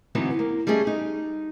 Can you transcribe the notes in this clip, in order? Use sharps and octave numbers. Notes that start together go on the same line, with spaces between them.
D3 E3 F#3 B3 C4 D#4
A#3
G3 A3 C#4 G#4 D#5
D#4